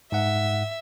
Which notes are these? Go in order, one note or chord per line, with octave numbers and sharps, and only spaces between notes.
G#2 E5 F#5